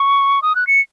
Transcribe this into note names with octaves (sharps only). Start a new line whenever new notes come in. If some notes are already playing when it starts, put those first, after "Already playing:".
Already playing: C#6
D#6
F#6
C#7